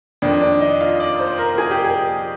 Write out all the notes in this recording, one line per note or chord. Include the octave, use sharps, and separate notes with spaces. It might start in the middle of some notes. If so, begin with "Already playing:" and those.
F2 D#3 D4
D4
D#4
F4
D5
C5
A#4
G#4
G4
G#4